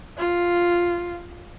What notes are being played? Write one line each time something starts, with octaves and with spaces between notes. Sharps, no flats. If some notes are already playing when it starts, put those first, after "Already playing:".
F4